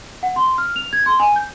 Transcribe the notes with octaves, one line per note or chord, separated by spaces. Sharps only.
F#5
C6
F6
F7
G#6
C6
G#5
G6